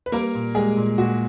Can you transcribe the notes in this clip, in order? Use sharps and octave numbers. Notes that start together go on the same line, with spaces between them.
B4
G3 A#3 A#4
A#2
G3 G#3 G#4
A#2
A#2 F#4